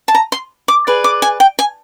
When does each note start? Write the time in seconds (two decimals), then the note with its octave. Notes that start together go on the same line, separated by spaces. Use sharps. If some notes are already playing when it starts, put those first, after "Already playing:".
0.08 A5
0.15 A#5
0.32 C6
0.68 D6
0.87 G#4 B4 D5
1.04 D6
1.22 G#5
1.40 G5
1.59 G#5